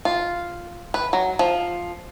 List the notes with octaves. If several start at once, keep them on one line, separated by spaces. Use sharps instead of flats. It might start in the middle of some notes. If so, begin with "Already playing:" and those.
F4
B4
F#3
F3